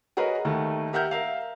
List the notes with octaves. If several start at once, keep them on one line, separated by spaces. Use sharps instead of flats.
F#4 G#4 A#4 B4 C#5 D#5
D#2 D#3 A3
G4 A#4 E5 F#5 F6 G6
A#4 E5 F5